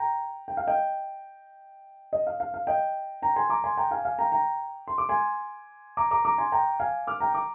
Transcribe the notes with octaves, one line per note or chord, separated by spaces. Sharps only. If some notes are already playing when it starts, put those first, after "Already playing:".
Already playing: G5 A#5
G5
F5
D#5 G5
D#5
F5
F5
F5
D#5 G5
G5 A#5
G#5 C6
A#5 D6
G#5 C6
G5 A#5
F5 G#5
F5 G#5
G5 A#5
G5 A#5
C6
D6
G#5 C6
A#5 D6
A#5 D6
A#5 D6
G#5 C6
G5 A#5
F5 G#5
D6 F6
G5 A#5
A#5 D6